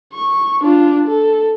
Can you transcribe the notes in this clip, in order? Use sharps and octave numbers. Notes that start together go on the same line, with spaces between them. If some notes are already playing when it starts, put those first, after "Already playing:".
C#6
D4 F4
A4